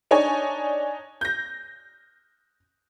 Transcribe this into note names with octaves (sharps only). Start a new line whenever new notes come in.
D4 D#4 C#5 G#5
G6 A#6